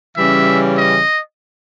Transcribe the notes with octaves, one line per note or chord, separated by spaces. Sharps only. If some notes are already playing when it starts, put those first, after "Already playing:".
C#3 E3 G3 C#4 E5
D#5